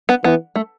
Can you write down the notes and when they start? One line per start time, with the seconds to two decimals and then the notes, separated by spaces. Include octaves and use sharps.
0.09 B3
0.24 E3 B3
0.56 A3